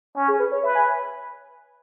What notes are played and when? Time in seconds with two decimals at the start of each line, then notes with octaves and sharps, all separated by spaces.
0.16 C#4
0.28 G#4
0.39 B4
0.52 C#5
0.63 B4 E5
0.75 G#5